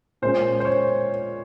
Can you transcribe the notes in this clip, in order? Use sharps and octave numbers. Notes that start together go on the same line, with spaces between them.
A#2 G#3 C#4 C5
C5
C#5